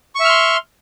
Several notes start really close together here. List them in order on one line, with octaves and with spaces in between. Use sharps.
C#6 E5 F6 C6